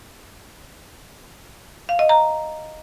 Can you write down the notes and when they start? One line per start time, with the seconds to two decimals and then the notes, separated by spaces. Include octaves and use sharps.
1.89 F5
1.99 D#5
2.09 A#5